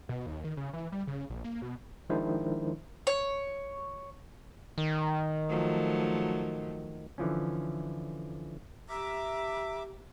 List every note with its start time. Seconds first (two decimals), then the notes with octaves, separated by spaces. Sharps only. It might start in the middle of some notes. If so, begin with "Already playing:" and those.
0.09 B2
0.26 D#2
0.44 D#3
0.57 C#3
0.73 E3
0.92 G3
1.07 C#3
1.30 A#1
1.44 A#3
1.62 B2
2.10 D#3 F3 G#3 D4 E4 C5
3.07 C#5
4.78 D#3
5.49 F3 F#3 A3
7.18 D3 E3 F3 C#4
8.89 G4 E5 A#5 D6